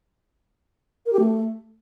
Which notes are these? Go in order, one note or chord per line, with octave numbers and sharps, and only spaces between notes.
A#4
G4
A3